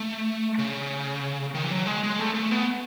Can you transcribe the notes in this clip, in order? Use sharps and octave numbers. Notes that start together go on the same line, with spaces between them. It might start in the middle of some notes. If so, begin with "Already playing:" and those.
Already playing: A3
C#3
D#3
E3
F#3
G#3
G#3
A3
A3
B3